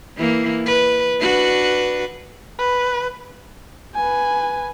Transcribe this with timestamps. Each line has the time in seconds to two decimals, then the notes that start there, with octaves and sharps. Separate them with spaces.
0.17 E3 A#3
0.66 B4
1.21 D4 F#4 B4
2.59 B4
3.95 B4 G#5